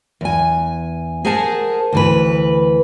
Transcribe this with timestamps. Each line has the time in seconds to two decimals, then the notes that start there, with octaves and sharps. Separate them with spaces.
0.21 E2 G#5
1.25 G#4 A#4 C5 F#5 G#5 A5
1.92 D2 E3 B4